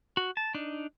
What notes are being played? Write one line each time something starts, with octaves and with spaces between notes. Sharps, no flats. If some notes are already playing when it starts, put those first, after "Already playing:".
F#4
A5
D4 D#4